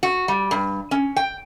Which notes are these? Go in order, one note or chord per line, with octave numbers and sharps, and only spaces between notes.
F#4
G3
G2
C#4
G5